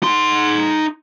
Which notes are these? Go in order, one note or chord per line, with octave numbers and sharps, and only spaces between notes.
D#4 C6